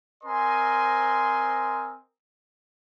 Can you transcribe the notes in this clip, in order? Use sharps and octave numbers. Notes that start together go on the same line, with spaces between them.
C4 A#4 C5 D#5 G#5 C6